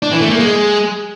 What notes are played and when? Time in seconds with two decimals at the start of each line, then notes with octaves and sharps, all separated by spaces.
0.02 D4
0.12 E3
0.21 A3
0.30 A#3
0.39 G#3